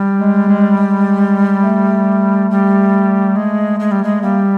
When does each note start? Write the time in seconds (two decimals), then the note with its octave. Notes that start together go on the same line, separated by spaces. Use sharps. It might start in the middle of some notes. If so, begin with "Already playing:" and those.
Already playing: G3
0.20 G#3
0.48 G#3
0.77 G#3
1.64 A3
2.51 G3
3.36 G#3
3.80 G#3
3.91 G3
4.04 G#3
4.22 G3 A#3